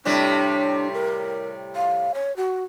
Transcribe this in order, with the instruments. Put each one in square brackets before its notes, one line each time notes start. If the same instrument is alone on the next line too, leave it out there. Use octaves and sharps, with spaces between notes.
[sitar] A2 C3 G3 [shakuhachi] D4
[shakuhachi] A#4
F5
C#5
F#4